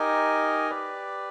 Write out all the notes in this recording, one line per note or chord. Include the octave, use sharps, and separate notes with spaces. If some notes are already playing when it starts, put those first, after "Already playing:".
Already playing: D#4 G4 A#4 D#5 G#5
G4 B4 D5